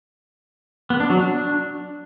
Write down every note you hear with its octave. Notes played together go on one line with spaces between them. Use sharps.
B3
D4
F#3
D4